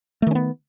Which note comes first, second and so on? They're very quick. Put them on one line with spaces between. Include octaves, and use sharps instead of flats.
A3 D#3 C#4 B3